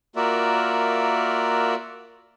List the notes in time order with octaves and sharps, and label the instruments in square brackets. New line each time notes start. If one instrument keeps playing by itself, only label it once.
[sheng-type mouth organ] A#3 F4 F#4 A#4 D5 E5